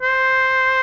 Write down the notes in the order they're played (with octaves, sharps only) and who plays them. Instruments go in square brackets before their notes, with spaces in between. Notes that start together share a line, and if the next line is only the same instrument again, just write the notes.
[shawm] C5